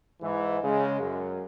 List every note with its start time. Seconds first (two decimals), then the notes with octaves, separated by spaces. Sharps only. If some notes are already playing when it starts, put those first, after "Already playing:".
0.22 G#2 E3
0.64 C#3 G#3
1.00 F#2